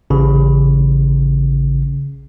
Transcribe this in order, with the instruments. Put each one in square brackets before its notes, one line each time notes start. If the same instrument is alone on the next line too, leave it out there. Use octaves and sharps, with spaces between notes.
[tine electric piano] A1 C#3